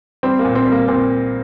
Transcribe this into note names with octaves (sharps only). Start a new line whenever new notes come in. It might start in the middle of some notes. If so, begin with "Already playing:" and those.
G3 C4
A#3
A#2
C4
G3
A#3
A#2 C4